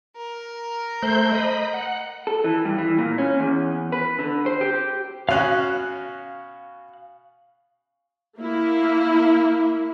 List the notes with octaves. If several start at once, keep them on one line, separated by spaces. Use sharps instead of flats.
A#4
A3 C5 G6
D#5 B5
F#5
A4
E3
G2
E3
A#2
C#4
E2
B4
D3
C5
G4
B2 C#4 F#4 F5 F#6
A#3 E4